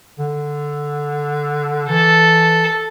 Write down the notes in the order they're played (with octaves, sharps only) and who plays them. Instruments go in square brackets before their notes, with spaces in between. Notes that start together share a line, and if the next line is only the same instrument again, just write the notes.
[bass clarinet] D3
[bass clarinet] E3 [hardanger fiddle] A4